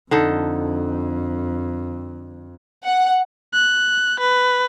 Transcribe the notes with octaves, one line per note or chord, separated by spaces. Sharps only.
F2 D3 D#4 A4
F#5
F#6
B4